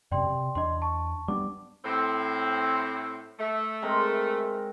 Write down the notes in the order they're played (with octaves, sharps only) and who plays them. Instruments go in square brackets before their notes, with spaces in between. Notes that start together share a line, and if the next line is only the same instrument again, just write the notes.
[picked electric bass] F#2 C3 [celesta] D5 G5 C6
[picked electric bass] C3
[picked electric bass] E2 D4 [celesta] D#5 C6
[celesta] A5 C#6
[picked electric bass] G3 B3 D4 [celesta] D6
[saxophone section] A2 C4
A3
[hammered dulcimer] G#3 C4 A#4